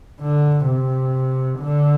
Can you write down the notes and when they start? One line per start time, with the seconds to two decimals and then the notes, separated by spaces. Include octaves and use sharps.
0.21 D3
0.67 C3
1.59 D3